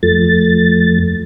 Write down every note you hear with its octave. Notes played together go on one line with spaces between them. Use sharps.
F2 F3 A3 A6